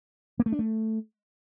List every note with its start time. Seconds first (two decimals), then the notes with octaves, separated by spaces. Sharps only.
0.40 A#3
0.46 A3
0.52 D4
0.59 A3